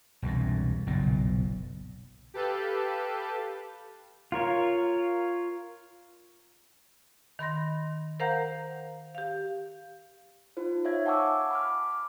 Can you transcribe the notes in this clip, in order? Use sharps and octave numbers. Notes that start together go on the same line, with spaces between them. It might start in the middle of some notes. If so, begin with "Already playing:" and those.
E1 C2 G2
F#1 B1 A#2
G4 A4 B4 F5 A5 G6
F4 A#4 C#5
D#3 B5 C6 A#6
A#4 C5 F5 F#5 A#5 G6
G4 F5
D#4 F4 C5
C#5 E5 F5 G#6
F#5 G#5 A5 C#6 D6 E6
B5 D6 F6